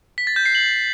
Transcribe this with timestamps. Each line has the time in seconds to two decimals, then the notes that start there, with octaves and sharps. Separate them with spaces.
0.18 B6
0.27 A6
0.36 G6
0.46 C7
0.55 F#7